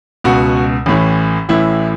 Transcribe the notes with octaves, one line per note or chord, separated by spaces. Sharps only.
C#2 B2 F#4
A1 A2 E3
A1 A2 E3 E4